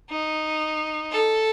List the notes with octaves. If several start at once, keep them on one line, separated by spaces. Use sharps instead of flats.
D#4
A4